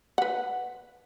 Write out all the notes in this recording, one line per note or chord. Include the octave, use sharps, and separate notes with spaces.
B4 F#5